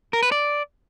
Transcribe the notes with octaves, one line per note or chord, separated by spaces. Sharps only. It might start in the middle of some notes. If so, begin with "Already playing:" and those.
A#4
B4
D5